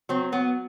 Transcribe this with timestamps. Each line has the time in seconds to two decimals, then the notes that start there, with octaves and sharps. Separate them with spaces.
0.09 F#3 C4
0.32 F#3 B3